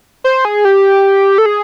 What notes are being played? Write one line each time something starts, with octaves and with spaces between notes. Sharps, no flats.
C5
G#4
G4
A4
G#4